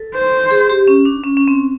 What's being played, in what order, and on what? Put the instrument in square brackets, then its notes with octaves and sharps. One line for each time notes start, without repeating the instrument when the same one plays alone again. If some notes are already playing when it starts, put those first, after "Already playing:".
Already playing: [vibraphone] A4
[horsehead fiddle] C5
[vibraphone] G#4
G4
C#4
D4
C#4
C#4
C4